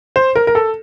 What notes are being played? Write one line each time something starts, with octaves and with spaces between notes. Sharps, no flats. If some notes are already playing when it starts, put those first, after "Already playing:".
C5
A#4
A#4
A4